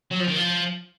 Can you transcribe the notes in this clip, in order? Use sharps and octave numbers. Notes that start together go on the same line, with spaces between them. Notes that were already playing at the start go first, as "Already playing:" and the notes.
F#3
F3
D#3
F3